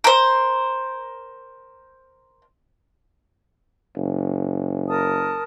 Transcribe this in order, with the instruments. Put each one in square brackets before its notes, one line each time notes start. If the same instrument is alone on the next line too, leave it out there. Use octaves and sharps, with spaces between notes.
[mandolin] A#4 C5
[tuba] F#1
[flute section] A#4 A5 D#6